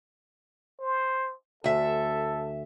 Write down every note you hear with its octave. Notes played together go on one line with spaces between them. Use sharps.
C5
D2 A4 E5